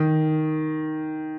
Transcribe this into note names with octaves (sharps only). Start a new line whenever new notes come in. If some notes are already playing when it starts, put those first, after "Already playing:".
Already playing: D#3